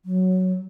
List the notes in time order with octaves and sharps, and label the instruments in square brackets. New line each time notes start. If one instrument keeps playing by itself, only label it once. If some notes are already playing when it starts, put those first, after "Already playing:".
[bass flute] F#3